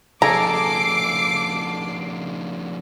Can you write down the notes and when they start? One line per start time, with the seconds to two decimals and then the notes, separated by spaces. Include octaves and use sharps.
0.22 F2 C#3 G#4 A4 G#5 A#5 D6 C7